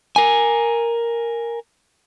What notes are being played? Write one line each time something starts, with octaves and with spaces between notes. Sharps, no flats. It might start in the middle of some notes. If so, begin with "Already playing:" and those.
A#4 G#5